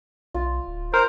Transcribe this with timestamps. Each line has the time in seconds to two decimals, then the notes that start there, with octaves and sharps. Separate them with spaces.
0.34 B1 F4
0.67 D1
0.94 A#4 C5